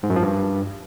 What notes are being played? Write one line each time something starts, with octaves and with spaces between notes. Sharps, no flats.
G#2
F#2
F3
G2